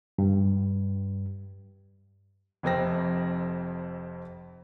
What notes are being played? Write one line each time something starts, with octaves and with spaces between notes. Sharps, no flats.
G2
F1 F2 C4 A#6